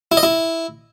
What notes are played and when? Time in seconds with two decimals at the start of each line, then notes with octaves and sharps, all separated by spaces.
0.12 E4
0.17 D#5
0.23 E4